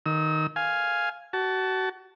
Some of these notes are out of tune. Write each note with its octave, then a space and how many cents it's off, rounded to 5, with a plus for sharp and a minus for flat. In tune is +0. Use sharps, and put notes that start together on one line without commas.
D#3 +0 E6 -40
F5 +0 G#5 +0
F#4 +30 A5 -5